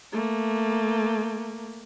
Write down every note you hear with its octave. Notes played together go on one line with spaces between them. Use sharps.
A3 A#3